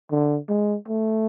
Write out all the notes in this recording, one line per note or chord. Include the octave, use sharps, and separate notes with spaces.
D3
G#3
A3